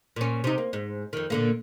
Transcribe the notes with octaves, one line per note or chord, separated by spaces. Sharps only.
A#2 C#4
C3 D#4
A#3
G#2
F2 D#3
A#2 D3 A#3